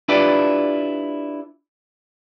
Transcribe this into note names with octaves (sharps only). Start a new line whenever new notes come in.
D4 E4 F4 G4 B4 D5